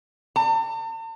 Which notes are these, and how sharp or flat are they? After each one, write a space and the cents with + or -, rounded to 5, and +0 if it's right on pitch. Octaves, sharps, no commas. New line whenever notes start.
A5 +45